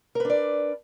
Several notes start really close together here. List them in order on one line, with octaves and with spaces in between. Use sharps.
A#4 B4 D4 D5